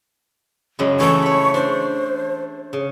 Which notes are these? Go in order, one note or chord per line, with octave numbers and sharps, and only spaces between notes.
F#2 C#3 G#3
E3 A3 C#6
C#5 B5
D4 C5
C#3